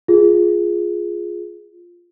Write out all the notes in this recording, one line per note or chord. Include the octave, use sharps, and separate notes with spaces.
F4 G#4